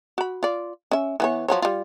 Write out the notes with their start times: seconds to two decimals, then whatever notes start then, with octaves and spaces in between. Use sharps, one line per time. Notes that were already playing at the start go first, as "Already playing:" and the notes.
0.18 F#4 B5
0.43 F4 D5
0.91 C#4 E5
1.20 E3 B3 C#5
1.48 F3 F#3 C#5
1.62 G3 F4